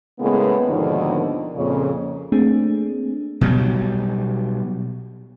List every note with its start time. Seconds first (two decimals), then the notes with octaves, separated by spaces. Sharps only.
0.19 A2 C#3 G#3 A#3 B3
0.67 D#2 G#2 B2 D3 D#3 F3
1.55 F2 A#2 C#3
2.32 A3 A#3 C4 D4 G#4
3.41 B2 F#3 G3